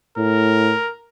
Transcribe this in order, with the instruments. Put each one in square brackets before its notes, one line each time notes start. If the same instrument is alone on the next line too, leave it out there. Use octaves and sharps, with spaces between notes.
[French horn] A2 [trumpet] A#4